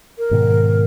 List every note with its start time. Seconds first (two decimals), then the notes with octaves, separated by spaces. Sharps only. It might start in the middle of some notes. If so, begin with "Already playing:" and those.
0.19 A#4
0.31 G#2 B2 D#3